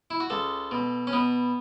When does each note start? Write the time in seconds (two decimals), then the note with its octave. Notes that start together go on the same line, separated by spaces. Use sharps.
0.10 E4
0.20 F#4
0.30 C#2 A4
0.71 B2
1.07 C#4
1.13 B2 B3